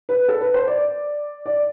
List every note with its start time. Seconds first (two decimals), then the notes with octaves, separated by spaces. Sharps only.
0.09 B4
0.28 A4
0.41 B4
0.54 C5
0.67 D5
1.46 D5